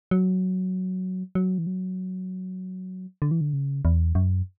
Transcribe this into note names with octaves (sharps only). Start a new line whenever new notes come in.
F#3
F#3
E3
F#3
D3
E3
D3
C#3
E2
F#2